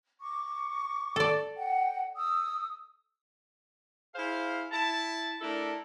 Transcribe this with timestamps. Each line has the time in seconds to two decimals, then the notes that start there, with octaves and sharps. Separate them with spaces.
0.20 C#6 D6
1.16 A4 D5
1.56 F#5 G5
2.16 D#6 E6
4.15 E4 G#4 C5 F5
4.71 E4 A5
5.41 A3 D4 E4 A4 A#4